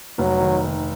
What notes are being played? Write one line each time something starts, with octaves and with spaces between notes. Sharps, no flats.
F1 F#3
D#3
D#3